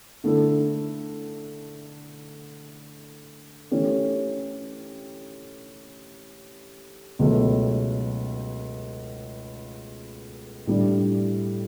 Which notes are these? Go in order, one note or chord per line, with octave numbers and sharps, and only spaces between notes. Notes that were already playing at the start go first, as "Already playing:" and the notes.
D3 A3 E4 A4
E3 A3 C#4 G4
C#2 B2 F#3 A3
A2 G3 D4